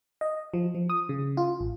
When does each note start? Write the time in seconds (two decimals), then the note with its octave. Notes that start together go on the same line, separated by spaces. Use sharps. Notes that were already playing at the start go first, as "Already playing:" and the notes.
0.21 D#5
0.54 F3
0.75 F3
0.90 D#6
1.09 C#3
1.37 F4
1.60 A1